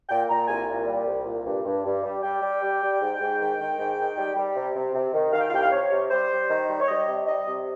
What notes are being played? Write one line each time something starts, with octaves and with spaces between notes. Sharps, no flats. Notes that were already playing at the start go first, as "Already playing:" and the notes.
A#2 G5
A#2 A#5
C2 G#5
A#2
G3
C2
A#2
G2
G2
G2
G3
G3 G5
G3
G3
G3
G#2
G#2
D#3
D#3
G#2
D#3
G3
G3
C3
C3
C3
D#3
D#3 F5
G5
F5
C2 G5
F5
C3 C#5
C3
G3 C5
G3
D#3
G3
C#5
G3 D#5
C3
G3 D#5
C3